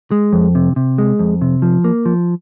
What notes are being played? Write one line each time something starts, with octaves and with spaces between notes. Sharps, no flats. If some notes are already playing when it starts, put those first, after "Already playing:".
G#3
F2
C3
C3
G#3
F2
C3
F3
A#3
F3